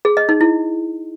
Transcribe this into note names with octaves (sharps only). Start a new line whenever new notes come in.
G#4
D#5
D#4
E4